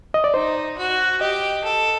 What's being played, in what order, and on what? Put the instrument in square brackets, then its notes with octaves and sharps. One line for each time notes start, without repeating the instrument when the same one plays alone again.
[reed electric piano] D#5
D5
[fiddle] D#4 [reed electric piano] C5
[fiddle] F#4
[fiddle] G4 [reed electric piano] D#5
[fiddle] A4